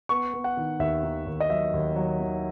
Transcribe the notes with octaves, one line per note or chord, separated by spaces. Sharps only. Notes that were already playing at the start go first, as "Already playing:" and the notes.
B3 C#6
B3
F#5
D#3
D#2 E5
D#3
D#2
D#5
F#3 E5
D#2
F#3
D#3